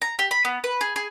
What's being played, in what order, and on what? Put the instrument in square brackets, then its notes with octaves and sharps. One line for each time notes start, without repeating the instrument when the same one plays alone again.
[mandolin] A#5
G4
B5
B3
B4
G#4
G#4